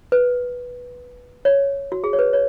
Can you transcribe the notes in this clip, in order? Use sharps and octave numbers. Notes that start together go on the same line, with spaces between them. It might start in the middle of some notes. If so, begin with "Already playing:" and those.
B4
C#5
F#4
G#4
C#5
B4
C#5